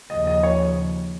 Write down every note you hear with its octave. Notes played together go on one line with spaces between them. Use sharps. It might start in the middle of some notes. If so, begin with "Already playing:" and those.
D#2 C#3 F3 D#5
D#5
C#5